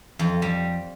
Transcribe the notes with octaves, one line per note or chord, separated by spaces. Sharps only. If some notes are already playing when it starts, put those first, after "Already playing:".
F2
G3